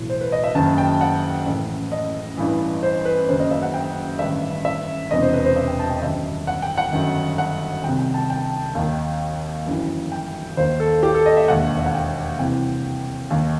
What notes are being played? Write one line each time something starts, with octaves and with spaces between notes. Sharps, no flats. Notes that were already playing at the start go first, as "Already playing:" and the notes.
Already playing: B1 A2 E3
C5
B4
D#5
E5
F#1 F#2 D#3 A5
G5
F#5
A1 A2 E3 E5
D#5
A1 G2 E3
C5
B4
F#1 F#2 D#3 C5
D#5
E5
F#5
G5
A1 G2 D#3 E5
E5
E1 E2 C3 D#5
C5
B4
C5
E5
G5
A5
G5
G1 F#2 D#3 E5
F#5
G5
F#5
G1 F#2 D#3
F#5
C2 C3 D#3 G5
G5
A5
G5
D#2 D#3
G1 F#2 E3
G5
D#2 D#3 C5
A4
G4
A4
D#5
E5
E1 D#2 D#3 F#5
E5
F#5
G5
C2 C3 E3 G5
D#2 D#3